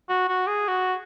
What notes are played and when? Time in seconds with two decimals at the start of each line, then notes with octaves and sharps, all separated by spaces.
0.09 F#4
0.28 F#4
0.47 G#4
0.68 F#4